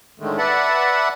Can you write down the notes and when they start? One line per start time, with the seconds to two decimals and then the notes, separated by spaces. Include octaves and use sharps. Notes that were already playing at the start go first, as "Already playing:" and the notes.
0.20 A2 D3 D#3 G#3 A3
0.38 B4 D5 E5 F#5 A5 B5